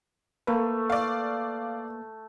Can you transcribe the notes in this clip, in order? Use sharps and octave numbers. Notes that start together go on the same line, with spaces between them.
A3 A#3 B4
D5 F5